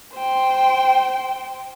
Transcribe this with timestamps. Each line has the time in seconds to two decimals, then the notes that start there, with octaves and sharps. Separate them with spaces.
0.15 C5 G5